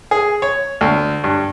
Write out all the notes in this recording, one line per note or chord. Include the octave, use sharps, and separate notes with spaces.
G#4
C#5
D2
G2